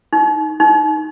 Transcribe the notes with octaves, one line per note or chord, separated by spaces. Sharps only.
D#4
D#4